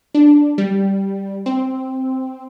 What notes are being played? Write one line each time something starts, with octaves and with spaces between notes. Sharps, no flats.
D4
G3
C4